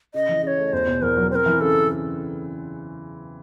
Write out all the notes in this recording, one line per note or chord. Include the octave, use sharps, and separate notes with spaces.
C#3 D#5
E3
C#3 C#5 D#5
A3
E2 C5
B2
E2 A#4
F#3
C4 A#4 C5
E3
C#3 A4